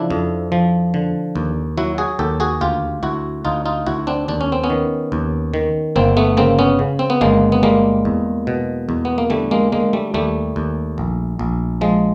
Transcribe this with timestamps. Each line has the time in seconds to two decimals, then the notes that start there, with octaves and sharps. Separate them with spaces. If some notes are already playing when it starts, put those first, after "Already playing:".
Already playing: C#3 F3 D4 E4
0.10 F2
0.52 F3
0.94 D3
1.36 D#2
1.78 F#3 E4 F#4
1.98 F#4 G#4
2.19 D#2 G4 A4
2.40 F#4 G#4
2.61 D2 F4 G4
3.03 D2 E4 F#4
3.45 D2 D#4 F4
3.65 D#4 F4
3.87 D2 E4 F#4
4.07 C4 D4
4.28 D#2 D4
4.41 C#4
4.52 C4
4.64 B3 C#4
4.70 D#3
5.12 D#2
5.54 D#3
5.96 G1 A#3 C4
6.17 A3 B3
6.37 C#3 A#3 C4
6.59 B3 C#4
6.79 C#3
6.99 C4
7.10 B3
7.21 G1 G#3 A#3
7.52 B3
7.63 G3 G#3 A#3
8.05 E2
8.47 B2
8.89 E2
9.05 B3
9.18 A#3
9.30 D3 G3 A3
9.51 G#3 A#3
9.72 D3 G#3 A#3
9.93 G3 A3
10.14 D#2 G3 A3
10.56 D#2
10.98 A#1
11.39 A#1
11.81 F3 G#3